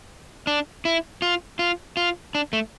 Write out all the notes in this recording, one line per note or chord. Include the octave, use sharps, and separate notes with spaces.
D4
E4
F4
F4
F4
D4
A3